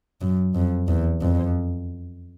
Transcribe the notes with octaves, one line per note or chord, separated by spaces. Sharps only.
F#2
F2
E2
F2